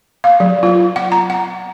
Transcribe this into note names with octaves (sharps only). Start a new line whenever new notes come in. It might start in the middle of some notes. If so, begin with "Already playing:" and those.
F5
F#3
F4
F#5
A#5
F#5